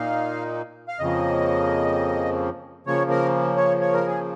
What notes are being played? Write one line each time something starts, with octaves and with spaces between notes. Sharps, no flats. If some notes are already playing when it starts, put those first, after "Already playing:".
Already playing: A#2 A#3 D#4 F5
F5
F2 C#3 F3 A#3 D#5
C#3 F3 A#3 C#5
A#4
C#5
C#5
A#4
G#4